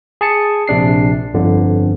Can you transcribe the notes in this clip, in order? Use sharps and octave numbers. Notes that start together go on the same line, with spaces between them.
G#4 A5 C#7
A#1 C3 D4 C7
G1 F2 D3